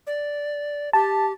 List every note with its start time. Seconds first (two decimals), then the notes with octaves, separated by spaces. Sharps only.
0.07 D5
0.93 G4 A5